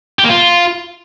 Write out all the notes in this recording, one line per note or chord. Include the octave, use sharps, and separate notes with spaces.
G4
A#3
F4